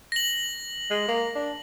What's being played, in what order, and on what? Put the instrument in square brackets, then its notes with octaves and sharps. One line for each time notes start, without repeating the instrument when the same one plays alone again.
[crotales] A#6 F#7
[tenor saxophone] G#3
A#3
D4